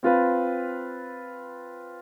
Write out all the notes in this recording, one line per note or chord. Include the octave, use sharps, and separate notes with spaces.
C4 F4 B4